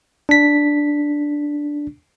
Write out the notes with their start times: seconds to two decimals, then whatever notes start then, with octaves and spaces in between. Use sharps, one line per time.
0.29 D4 B6